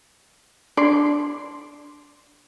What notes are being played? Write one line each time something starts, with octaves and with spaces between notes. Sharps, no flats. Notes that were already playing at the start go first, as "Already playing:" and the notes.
D4 D5 C6 C7